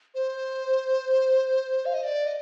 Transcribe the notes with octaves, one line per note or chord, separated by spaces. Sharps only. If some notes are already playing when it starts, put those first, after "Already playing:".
C5
F5
D#5
D5
D#5